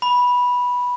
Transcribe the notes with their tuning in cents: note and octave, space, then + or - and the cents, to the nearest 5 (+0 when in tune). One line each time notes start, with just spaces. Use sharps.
B5 -10